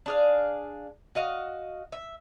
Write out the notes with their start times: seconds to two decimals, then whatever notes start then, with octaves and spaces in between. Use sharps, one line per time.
0.06 D4 G#4 F5
1.15 F#4 D#5 F5
1.92 E5